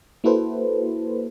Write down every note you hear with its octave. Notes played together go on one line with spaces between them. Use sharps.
A#3 E4 F#4 A4 B4 C5